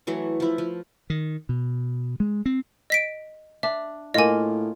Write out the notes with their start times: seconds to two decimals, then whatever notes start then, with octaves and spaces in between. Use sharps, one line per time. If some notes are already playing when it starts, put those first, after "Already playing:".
0.07 E3 F#3 A3
0.40 F3 E4
0.58 F3
1.10 D#3
1.49 B2
2.20 G#3
2.46 C4
2.90 D#5 B6 D7
3.63 D4 E5
4.14 A2 A#3 F4 D#5 G#5